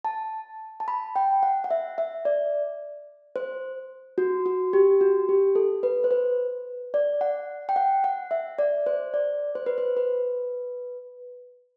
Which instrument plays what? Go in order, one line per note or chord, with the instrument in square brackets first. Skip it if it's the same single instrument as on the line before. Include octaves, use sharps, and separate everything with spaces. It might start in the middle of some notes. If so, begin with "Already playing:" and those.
[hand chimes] A5
A5
B5
G5
F#5
F#5
E5
E5
D5
C5
F#4
F#4
G4
F#4
G4
A4
B4
C5
B4
D5
F#5
G5
F#5
F#5
E5
D5
C5
D5
C5
B4
C5
B4